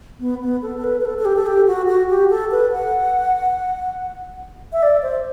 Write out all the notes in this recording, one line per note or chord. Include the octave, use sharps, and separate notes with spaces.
B3
B3
A4
A4
B4
B4
A4
A4
G4
A4
G4
F#4
F#4
G4
A4
B4
F#5
E5
D5
C5